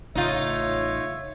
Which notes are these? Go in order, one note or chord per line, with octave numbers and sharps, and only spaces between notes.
A1 C#3 D#4 F4 C#5 E5